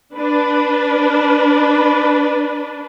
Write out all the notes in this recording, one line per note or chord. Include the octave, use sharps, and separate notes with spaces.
D4 B4